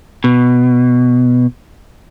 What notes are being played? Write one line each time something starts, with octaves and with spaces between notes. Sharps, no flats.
B2